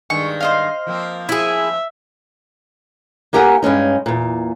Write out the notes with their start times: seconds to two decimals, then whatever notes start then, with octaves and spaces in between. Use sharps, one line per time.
0.10 G2 D#3 G#3 C#6
0.41 C5 D#5 F5
0.87 F3 A#3 C4
1.29 E4 G#4 E5
3.33 A#3 D#4 G4 A#4 F#5 G#5
3.62 G2 G#3 C#4 D#4
4.06 E2 A#2